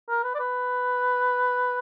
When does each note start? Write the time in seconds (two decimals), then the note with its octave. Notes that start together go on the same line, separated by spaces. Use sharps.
0.09 A#4
0.24 B4
0.35 D5
0.40 B4